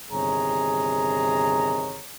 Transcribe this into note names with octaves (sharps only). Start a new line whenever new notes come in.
G1 C3 D#3 G#4 C#5 A#5